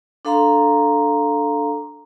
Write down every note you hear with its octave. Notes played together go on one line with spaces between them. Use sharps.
D4 A4 F5 A#5 C6